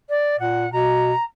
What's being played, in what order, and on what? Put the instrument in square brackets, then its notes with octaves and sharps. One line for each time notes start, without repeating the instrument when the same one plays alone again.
[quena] D5
[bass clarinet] A#2 [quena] F#5
[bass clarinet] B2 [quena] A#5